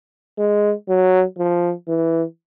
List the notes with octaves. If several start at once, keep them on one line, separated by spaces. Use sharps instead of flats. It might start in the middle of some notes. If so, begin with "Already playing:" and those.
G#3
F#3
F3
E3